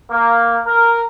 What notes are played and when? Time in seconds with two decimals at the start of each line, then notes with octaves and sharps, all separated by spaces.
0.11 A#3
0.66 A#4